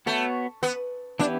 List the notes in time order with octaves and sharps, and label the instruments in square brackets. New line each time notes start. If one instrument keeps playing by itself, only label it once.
[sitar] A3 [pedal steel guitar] B3 F#4 C#5
[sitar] B3
[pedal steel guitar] E3 B3 E4 G4 [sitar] D4